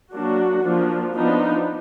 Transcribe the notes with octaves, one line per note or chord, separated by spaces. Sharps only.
F#3 A#3 D4 F#4
F3 A#3 D4
F3 B3 D4 D#4